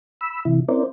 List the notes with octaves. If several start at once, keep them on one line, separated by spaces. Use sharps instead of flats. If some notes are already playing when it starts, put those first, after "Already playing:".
B5 E6
C3 E3 E4
C4 C#4 E4 A#4 C5 D5